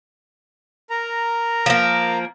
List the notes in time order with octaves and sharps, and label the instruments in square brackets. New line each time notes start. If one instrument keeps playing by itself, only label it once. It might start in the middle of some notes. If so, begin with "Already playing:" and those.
[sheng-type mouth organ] A#4 A#5
[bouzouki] F3 A#3